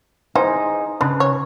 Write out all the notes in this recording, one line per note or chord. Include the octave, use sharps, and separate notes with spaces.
E3 D#4 G#4 C5
C#3 D4 B4
C#5